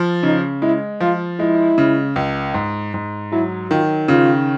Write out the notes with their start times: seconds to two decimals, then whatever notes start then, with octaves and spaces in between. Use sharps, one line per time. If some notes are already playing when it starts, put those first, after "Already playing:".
Already playing: F3
0.23 C#3 D#4
0.62 G#3 E4
1.00 F3 F4
1.39 G#3 E4
1.78 C#3
2.16 C#2
2.54 G#2
2.94 G#2
3.32 F#3 E4
3.70 D#3 F4
4.08 C#3 F4